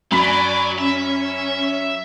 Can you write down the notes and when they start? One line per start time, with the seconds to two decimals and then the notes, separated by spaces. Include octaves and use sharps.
0.12 F#2 F#3 D5 G#5 B5 D6 B6
0.79 C#4 E5